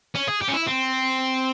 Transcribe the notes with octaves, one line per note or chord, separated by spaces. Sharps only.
C#4
G#4
G4
C#4
E4
C4